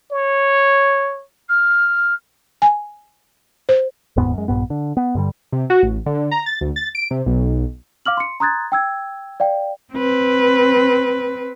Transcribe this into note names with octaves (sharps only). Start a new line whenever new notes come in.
C#5
F6
G#5
C5
F1 D#2 G#2 B3
F#2 G#3
A#1 G2 B3
D3
B3
G2 D3 G3
C3
F#4
A1
D3
A#5
A6
D2
A6
D7
C3
B1
F5 D6 F6 F#7
C6 C#7
A#5 C6 D#6 F#6 G#6 A6
G5 E6 G#6
D5 F5 G5
C4 B4